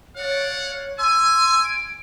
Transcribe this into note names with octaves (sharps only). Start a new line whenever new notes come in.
C#5 D5 F5 F#5
G#5 C6 E6
D7